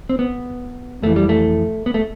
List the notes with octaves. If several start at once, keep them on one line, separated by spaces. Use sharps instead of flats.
C4
B3
F2 E3 A3
G3
A3
B3
A3